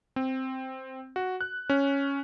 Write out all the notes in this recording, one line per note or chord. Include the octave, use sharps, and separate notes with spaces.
C4
F#4
F#6
C#4